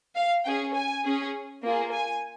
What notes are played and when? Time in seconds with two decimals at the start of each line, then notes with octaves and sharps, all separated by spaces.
0.16 F5
0.45 C#4 G#4 G5
0.74 G#5
1.04 C#4 G#4
1.63 A#3 F4 G#4
1.92 G#5